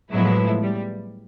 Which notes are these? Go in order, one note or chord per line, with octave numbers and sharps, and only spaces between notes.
A2 F3 F#3 G#3 B3 E4
G3